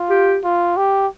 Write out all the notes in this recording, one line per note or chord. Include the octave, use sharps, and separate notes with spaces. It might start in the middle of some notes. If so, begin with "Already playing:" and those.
Already playing: F4
G4
F4
G4